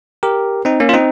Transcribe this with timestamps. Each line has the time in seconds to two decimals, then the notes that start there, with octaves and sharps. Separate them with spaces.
0.23 G4 A#4
0.65 C4 D#4
0.80 A#3 C#4
0.89 F4
0.94 C4 D#4